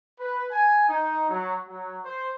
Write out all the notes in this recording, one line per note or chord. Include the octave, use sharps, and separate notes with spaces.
B4
G#5
D#4
F#3
F#3
C5